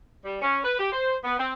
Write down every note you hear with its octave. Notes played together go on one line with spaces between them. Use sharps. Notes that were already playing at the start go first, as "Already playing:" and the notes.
G3
C#4
B4
G4
C5
B3
C4